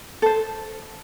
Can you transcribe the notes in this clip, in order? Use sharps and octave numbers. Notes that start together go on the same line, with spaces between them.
A4 C5